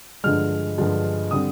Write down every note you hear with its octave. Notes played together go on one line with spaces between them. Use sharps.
G2 D3 F3 G#3 F6
G2 D3 F3 G#3
D3 G3 C4 D#6